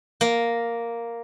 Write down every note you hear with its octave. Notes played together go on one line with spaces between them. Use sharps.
A#3